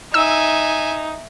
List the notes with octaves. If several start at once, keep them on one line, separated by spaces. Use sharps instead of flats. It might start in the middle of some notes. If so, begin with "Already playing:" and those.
D#4 E5 G#5 E6